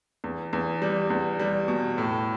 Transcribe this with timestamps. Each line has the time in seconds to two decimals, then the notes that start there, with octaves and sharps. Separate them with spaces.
0.24 E2
0.53 E2
0.82 G3
1.10 E2
1.39 G3
1.68 B2
1.98 A2